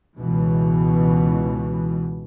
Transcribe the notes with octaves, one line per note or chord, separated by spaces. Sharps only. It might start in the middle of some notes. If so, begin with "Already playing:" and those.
C#2 B2 E3